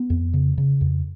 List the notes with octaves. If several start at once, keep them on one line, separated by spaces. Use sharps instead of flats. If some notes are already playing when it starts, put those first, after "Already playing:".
Already playing: B3
F2
C#3
C#3
F2